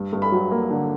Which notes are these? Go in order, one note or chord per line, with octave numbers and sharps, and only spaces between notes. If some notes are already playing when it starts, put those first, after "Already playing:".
Already playing: G2
G2
B5
F#3
A#3
D3